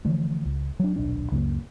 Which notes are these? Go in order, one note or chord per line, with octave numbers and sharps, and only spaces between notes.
D3 E3 F3 A3
C#2
F#3 D4
D#1 B1 D4
C#2 F#2 C#3 A#3